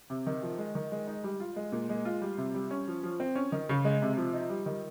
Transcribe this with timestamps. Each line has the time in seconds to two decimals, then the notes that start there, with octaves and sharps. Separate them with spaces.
0.10 C3
0.27 D#3
0.42 F3
0.58 G#3
0.75 D#3
0.92 G#3
1.07 D#4
1.24 G3
1.40 F4
1.56 G#3
1.72 A#2
1.89 G#3
2.05 F4
2.22 G3
2.38 C3
2.54 G3
2.71 C#4
2.88 F3
3.03 F3
3.20 C4
3.35 C#4
3.52 D#3
3.69 C#3
3.85 G#3
4.02 C3
4.17 F3
4.34 D#4
4.50 G3
4.66 D#3